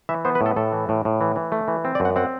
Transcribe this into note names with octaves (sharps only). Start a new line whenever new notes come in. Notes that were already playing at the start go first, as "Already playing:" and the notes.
E3 E5
B3 C5
B4
A2
A4
A2 A4
E3
A2
A2
E3
E3
A3
E3
C4
D5
F#2
F#5
C4 F#5